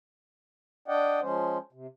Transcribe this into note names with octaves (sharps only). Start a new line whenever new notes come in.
D4 D5 D#5 F#5 G5
F3 G#3 C#4 C5
C3